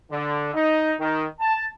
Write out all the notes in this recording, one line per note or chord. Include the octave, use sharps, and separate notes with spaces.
D3
D#4
D#3
A5